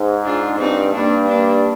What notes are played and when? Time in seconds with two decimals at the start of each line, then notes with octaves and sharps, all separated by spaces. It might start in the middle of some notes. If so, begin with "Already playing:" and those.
Already playing: G#2
0.25 D4 F4
0.59 G2 C4 D#4
0.93 G2 A#3 D4
1.28 A#3 D4